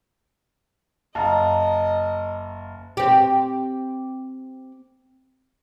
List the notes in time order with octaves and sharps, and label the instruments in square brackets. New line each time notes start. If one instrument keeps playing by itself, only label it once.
[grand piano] F#1 F5 [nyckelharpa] D#5 [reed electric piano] A5 A#5
[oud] C4 G4